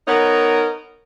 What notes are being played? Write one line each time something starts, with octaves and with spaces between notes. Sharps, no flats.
B3 D#4 A#4 C#5